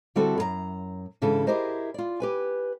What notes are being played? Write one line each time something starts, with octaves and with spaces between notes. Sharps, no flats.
D3 G3 C4 E4 F#4 A4
F#2 A#4 A#5
G#2 C#3 E3 D4 A4
E4 G4 G#4 A#4 C5 D#5
F4 D5
G4 B4 G#5